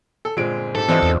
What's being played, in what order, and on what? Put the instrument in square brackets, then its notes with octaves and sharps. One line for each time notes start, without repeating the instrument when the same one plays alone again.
[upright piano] A4
[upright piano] G1 G#3 D7 [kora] A#2 C4
[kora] G#2 G4 [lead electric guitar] A4
[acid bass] E3 [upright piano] C4 C5 D#5 [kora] D4 F4
[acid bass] E2